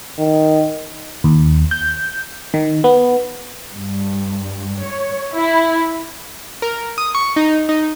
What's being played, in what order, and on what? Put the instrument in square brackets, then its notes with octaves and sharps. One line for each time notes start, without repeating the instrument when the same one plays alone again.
[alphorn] D#3
[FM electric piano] D#2
G6
D#3
B3
[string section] G2
C#5
E4
[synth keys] A#4
D#6
C#6
D#4
D#4